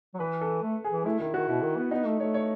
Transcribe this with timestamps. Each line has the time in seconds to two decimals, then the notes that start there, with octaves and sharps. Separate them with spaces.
0.14 F#3
0.20 E3 B4
0.41 A4
0.63 A3
0.84 G#4
0.91 E3
1.06 A3 E4
1.20 D#3 E4
1.34 D#3 F#4
1.49 B2 E4
1.63 D#3
1.77 B3
1.91 B3 D#4
2.05 A3
2.20 A3 C#5
2.34 C#5